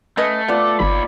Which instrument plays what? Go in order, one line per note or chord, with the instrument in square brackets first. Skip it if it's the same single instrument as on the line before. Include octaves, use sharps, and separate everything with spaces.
[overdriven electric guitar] A3 [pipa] C#4 B4 D#5
[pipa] B3 [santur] F4 D5
[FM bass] G1 [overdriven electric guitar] D#2 B5